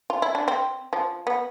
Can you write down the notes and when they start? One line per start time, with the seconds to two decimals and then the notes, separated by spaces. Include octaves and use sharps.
0.10 F4
0.22 E4
0.35 D4
0.48 C4
0.93 F3
1.27 B3